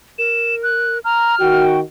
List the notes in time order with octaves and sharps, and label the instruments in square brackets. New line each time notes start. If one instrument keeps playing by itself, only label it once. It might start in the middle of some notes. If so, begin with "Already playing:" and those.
[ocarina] A#4 [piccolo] E7
[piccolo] F#6
[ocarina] A#5 [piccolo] F6
[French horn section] D#3 F#4 [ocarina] G5